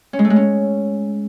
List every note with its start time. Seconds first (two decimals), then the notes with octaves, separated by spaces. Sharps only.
0.13 C#4
0.19 G#3
0.25 A3
0.30 G#3
0.36 C#4